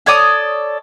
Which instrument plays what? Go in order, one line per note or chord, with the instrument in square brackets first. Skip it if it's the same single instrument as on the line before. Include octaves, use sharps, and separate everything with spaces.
[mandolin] A4 C#5 D5 D#6